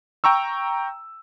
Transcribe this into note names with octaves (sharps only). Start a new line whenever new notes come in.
G5 A#5 C#6 E6